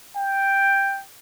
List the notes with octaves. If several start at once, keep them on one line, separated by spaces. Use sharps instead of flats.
G5